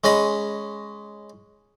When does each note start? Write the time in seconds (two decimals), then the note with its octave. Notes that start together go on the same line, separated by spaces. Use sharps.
0.04 G#3 C#4 D#5 B5